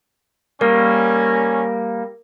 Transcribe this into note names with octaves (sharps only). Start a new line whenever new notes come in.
G3 A#3 C#4 A#4